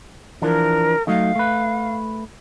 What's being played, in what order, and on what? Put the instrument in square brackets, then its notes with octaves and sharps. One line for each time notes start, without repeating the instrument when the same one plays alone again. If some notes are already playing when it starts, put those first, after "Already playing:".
[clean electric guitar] E3 F3 D4 [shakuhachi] A#4
[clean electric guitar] F#3 A3 D#4 [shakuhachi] F5
[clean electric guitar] A3 B4